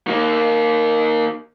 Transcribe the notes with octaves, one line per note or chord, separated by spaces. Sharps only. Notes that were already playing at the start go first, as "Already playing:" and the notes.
D#3 A#3